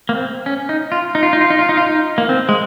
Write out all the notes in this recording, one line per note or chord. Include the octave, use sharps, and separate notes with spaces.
A#3
C4
C#4
D#4
F4
D#4
F4
D#4
F4
D#4
F4
D#4
F4
D#4
A#3
C4
G#3